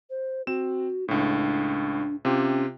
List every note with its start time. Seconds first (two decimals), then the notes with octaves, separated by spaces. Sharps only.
0.10 C5
0.47 C4 F#4 E7
1.08 C#2 A2 D4
2.25 C3 C#4 F4 G4